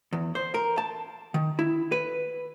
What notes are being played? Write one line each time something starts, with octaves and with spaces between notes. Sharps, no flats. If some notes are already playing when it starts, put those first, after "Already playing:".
E2
C5
A#4
A5
D#3
E4
B4